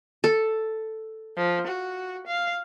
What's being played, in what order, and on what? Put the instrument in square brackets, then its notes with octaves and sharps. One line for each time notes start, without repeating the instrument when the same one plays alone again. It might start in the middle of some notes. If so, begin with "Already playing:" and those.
[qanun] A4
[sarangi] F3
F#4
F5